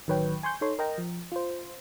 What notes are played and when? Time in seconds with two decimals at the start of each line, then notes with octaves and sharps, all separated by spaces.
0.07 A1 D#3 F#3 B4 C#5 G5
0.43 G#5 C6 C#6 G6
0.61 D#4 A4 C#5 C6
0.79 A#4 D#5 G5 A#5
0.98 F3
1.32 F4 C5